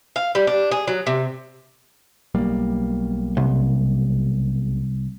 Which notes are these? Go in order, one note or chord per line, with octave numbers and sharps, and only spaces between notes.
F5
G3
D4
G#4
F#3
C3
B1 G3 A#3
C2